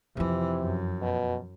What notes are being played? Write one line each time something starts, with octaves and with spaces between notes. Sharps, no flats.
F2 C3 E3 F3
F#2
B2